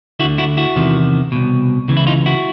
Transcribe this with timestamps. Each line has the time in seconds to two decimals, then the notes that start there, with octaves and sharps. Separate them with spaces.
0.19 D3 E4 F#4
0.24 D2
0.38 E4 F#4
0.57 E4 F#4
0.76 E2 C3 D#3
1.32 C2 B2
1.88 C#2 C#3 E3
1.97 E4
2.07 D#4 F4
2.26 E4 F#4